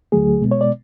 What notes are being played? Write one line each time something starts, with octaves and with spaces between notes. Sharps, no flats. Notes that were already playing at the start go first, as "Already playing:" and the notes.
D2 D3 F#3 A3 G#4
B2 G#3 B3
C#5
D5